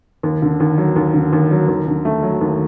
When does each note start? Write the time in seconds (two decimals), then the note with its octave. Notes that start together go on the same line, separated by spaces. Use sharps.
0.23 D#2
0.42 D3
0.60 D#2
0.78 F#3
0.96 D#2
1.14 D3
1.33 D#2
1.51 F#3
1.68 D#2
1.87 D3
2.05 A3
2.23 F#3
2.41 D#2